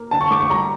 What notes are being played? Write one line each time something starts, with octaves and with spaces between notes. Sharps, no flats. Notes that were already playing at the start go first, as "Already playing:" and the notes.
Already playing: A#3
D3 A5
C#6
A3 D6
C#6
G3 A#5